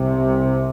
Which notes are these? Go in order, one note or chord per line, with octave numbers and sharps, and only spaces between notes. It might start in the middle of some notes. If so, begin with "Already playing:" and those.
Already playing: C2 C3